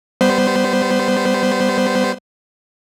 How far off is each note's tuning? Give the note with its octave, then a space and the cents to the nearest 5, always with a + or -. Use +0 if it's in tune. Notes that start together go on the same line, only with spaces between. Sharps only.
G3 +0 B3 +0 C5 -15